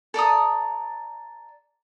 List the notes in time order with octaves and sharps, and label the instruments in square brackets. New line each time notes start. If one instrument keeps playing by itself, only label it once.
[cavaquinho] A4 D5 A#5 D#6